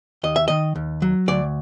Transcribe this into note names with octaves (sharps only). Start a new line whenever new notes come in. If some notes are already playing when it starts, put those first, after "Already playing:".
D#2 D#5
E5
D#3 D#5
D#2
F#3
D2 D5